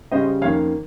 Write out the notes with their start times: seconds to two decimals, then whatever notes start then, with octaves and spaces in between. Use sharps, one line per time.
0.12 C#3 G3 C#4 C5 D#5
0.41 F2 D#3 A#3 C#4 C#5 F5